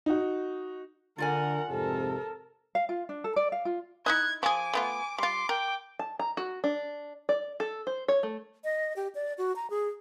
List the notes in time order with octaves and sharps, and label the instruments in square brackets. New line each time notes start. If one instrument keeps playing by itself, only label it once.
[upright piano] D#4 F#4
[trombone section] D3 [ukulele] F4 D5 G#5 [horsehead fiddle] A#4 F#5
[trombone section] F2 G#2 C3 [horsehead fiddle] A4 A#4
[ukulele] F5
F4
D4
A4
D5
F5
F4
[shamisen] D#4 E4 D#5 [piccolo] F#6 [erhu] G#6
[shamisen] F3 G#4 [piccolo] G#5 [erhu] D6
[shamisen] A3 B3 F4
[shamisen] G3 F4 [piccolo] C6 [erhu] D6
[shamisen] A#4 [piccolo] G5
[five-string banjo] A5
A#5
F#4
D4
D5
A4
C5
C#5
A3
[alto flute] D#5
G4
D5
F#4
A#5
G#4